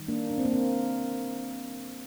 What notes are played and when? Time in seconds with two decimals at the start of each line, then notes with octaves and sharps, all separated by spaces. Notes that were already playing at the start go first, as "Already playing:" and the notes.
Already playing: D#3 G3
0.08 A#3 D4
0.30 D4
0.38 C4
0.45 A#3
0.53 C4